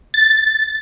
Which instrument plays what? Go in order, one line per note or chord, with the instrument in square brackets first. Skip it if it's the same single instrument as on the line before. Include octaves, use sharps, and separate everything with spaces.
[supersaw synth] A6